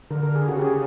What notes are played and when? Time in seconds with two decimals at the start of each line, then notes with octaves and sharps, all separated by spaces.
0.11 D3 A#4
0.23 A#4
0.35 G#4
0.48 C#3 F#4
0.57 G4
0.61 G#4